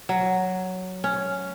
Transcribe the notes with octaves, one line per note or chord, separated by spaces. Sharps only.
F#3
C#4